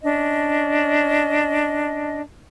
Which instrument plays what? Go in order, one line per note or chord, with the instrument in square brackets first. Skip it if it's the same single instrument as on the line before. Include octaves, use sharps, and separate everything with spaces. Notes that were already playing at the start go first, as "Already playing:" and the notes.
[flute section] C#4 D4 D#5